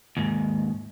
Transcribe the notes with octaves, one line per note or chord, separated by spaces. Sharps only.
D#2 G#2